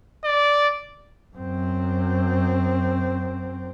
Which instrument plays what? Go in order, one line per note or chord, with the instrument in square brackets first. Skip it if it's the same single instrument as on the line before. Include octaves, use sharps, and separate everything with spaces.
[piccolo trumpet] D5
[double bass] F#2 C4